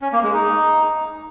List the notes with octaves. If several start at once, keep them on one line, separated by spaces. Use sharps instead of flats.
C#4
A#3
G#3
D#4